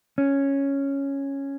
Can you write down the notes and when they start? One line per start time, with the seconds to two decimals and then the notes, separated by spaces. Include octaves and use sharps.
0.18 C#4